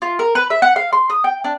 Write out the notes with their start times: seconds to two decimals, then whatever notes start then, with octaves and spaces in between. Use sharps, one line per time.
0.02 F4
0.19 A#4
0.35 B4
0.50 E5
0.62 F#5
0.76 F5
0.93 C6
1.10 D#6
1.24 G5
1.44 D4